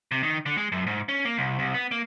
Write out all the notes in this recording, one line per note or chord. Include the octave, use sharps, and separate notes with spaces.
C3
D#3
D3
G#3
F#2
G#2
C#4
A#3
C2
C2
B3
A#3